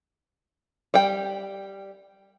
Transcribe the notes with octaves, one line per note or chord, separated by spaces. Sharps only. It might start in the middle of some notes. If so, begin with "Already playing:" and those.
G3 G5